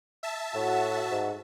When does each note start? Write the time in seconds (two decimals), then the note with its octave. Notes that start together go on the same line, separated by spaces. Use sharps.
0.23 E5 A5
0.55 A2 F#4
1.11 G#2